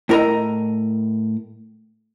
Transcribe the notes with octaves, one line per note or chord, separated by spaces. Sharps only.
A2 E4 A#4 C#5 D#5 A#5